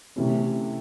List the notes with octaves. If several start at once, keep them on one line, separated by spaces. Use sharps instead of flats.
C3 E3 A3 C#4